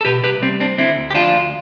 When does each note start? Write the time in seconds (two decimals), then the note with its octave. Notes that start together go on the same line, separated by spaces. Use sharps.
0.01 A4
0.05 B2 G4 B4
0.23 C2 G4 B4
0.42 G3 C4
0.60 C4 D4
0.78 D3 C4 E4
0.97 D2
1.11 G4
1.15 F3 D4 F4
1.34 D2